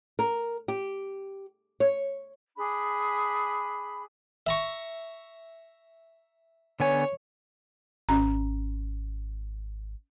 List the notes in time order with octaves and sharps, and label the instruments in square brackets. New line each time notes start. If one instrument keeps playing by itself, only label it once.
[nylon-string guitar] A#4
G4
C#5
[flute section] D4 G#4 B5
[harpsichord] E5 A#5 C#6
[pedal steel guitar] D3 B3 G#5 [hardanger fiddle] C#5
[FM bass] G#1 [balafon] C#4 A#5